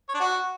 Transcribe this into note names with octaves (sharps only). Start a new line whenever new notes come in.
C#5
D4
F#4